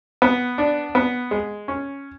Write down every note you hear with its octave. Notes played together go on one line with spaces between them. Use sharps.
B3
D4
B3
G#3
C#4